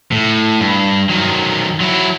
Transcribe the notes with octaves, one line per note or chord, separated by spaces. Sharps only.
A2
G2
D#3 F#3
F#3 E4